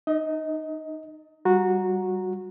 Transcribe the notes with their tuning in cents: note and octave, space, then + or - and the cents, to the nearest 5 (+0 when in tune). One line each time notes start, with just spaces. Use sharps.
D#4 -25 D#5 +25
G3 -20 F#4 -15 A#5 +0